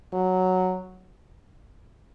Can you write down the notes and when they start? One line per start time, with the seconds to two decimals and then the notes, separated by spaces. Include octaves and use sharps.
0.13 F#3